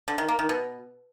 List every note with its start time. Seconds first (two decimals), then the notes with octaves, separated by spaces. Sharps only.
0.08 D3
0.18 D#3
0.28 A#3
0.39 D#3
0.49 B2